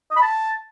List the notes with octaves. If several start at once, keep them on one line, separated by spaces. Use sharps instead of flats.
D#5
B5
A5